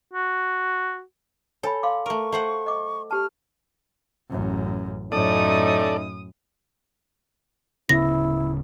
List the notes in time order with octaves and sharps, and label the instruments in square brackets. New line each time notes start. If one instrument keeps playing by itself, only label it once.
[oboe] F#4
[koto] A4 [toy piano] C#5 G#5 B5
[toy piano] F5 C6 D6
[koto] A3 A#4 [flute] C#6
[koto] A3 C5 F#5
[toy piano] D#5 D6
[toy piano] G4 A5 [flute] F6
[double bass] A1 F#2
[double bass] F#2 A2 [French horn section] A3 C#4 D#4 [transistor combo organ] A4 D5 [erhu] D#6
[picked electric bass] D1 C#3 B3 [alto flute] E4 [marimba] A#6